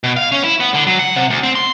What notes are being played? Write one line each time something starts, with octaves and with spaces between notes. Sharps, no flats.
B2
F5
C#4
E4
B3
D3
F#3
F#5
C3
D2
C4
C6